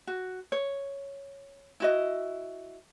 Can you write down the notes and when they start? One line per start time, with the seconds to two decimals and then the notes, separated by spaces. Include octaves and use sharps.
0.07 F#4
0.52 C#5
1.80 E4 F#4 D#5